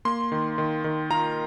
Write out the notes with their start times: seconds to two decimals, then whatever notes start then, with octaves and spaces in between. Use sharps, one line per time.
0.05 A#3 C6
0.32 D#3
0.58 D#3
0.84 D#3
1.10 F4 A#5